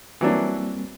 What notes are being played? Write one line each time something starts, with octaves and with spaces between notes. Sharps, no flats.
E3 F#3 G3 A#3 C4 D4